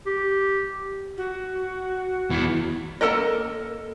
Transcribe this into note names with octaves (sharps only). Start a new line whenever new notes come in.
G4
F#4
E2 E3
A#3 D#4 A4 A#4 D#5